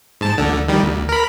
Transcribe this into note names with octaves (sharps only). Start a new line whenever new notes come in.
G#2 A5
D2 D3
D#3 G3
D2
A#4 B5